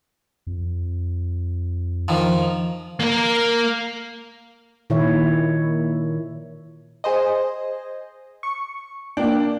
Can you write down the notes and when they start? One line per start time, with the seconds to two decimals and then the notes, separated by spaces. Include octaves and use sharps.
0.47 F2
2.08 D#3 F3
3.00 A#3 A#4
4.90 A#2 D#3 E4 C#5 E5
7.04 G#4 C5 D#5
8.43 C#6
9.17 A#3 D4 G5